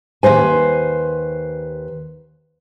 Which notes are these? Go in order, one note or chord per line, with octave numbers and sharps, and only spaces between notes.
D#2 A#2 B4 C5 G#5